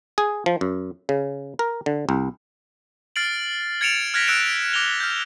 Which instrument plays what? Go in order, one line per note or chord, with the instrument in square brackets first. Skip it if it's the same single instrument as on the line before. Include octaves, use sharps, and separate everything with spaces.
[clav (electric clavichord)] G#4
F3
F#2
C#3
A#4
D3
C2
[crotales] F6 A6 C7 D7 F#7
G#6 A6 C#7 D7 E7 F7
F6 F#6 G#6 A#6 B6 D7
E6 F#6 C#7 D7 E7
D6 F6 A#6 D7 F7 G7
F6 G6